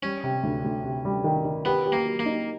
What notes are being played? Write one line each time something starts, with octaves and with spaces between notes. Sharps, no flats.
G3 C#4
C3
D2
D2
C3
G3
D#3
D#3
B3 G4
G4
A#3
F#3
A#3
D#4